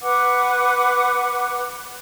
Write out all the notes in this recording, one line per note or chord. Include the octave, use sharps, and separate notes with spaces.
B4 F#5 C#6 D6